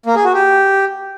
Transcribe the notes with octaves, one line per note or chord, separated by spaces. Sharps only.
A#3
G#4
F#4
G4